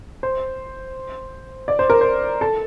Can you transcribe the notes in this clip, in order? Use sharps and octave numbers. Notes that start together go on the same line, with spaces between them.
C5
D5
C5
A#4
C5
A4